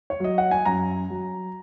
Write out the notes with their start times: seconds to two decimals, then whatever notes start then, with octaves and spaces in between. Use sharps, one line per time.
0.10 C#5
0.20 F#3 D#5
0.38 F#5
0.51 G#5
0.65 F#2 A#5
1.10 F#3